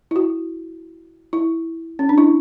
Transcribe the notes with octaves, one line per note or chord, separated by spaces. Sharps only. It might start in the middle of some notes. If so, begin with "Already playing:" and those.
E4
F#4
E4
C#4
D4
E4